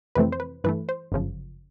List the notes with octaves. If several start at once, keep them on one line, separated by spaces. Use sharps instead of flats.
F2 C3 E3 A3 C4 B4
C5
B4
G2 E3 A3 B4
C5
G1 F#2 C#3 F3